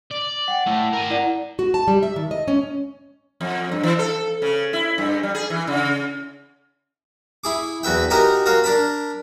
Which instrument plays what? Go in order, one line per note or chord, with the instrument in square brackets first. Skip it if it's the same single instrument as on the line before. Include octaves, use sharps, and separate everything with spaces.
[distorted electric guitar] D5
[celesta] F#5 G5
[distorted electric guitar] A3 E4
A#4 G#5
[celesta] E4 D5 F#5
[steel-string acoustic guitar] F#4
A5
G3
E5
D#3
D#5
C#4
[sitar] F2
G2
E3
A4
C#3
E4
G2
G3
G#4
E3
C#3
[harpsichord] E4 G#4 D6
E2 F#4 B4 E5 G5
D#4 F#4 G4 A#4 G#5 A#5
F#4 A#4 C#5 F5
D4 A#4 A5 B5